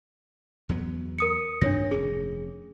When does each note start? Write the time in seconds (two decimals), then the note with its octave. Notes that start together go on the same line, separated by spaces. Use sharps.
0.69 E2 F#3 B3
1.18 A#4 D#6 C#7
1.61 G2 D#3 C4 D4 C#5 A#6
1.91 F1 C#4 G#4